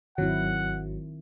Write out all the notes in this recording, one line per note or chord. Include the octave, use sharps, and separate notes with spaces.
G#1 D#3 F#3 C4 E4 F#5